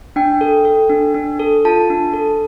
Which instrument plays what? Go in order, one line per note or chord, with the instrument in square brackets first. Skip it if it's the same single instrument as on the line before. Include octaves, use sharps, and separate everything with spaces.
[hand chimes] D4 G5
A4
A4
D4
D4
A4
F4 A5
D4
A4